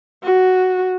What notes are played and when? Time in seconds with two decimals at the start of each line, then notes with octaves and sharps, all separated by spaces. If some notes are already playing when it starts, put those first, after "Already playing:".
0.24 F#4